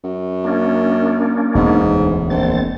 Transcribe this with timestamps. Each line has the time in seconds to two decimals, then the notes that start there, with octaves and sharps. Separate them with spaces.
0.04 F#2
0.44 A#3 C#4 D4
1.55 E1 D2 G#2 B3
2.30 A#1 C4 A6